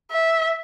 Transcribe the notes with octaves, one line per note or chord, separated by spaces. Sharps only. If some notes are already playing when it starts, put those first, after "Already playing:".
E5